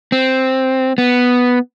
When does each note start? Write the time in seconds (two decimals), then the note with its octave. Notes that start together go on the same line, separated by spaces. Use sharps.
0.12 C4
0.98 B3